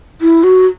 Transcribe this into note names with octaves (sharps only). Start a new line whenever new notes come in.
E4
F#4